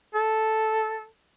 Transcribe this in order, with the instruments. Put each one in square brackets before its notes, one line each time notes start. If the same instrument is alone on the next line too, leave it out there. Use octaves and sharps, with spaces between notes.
[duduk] A4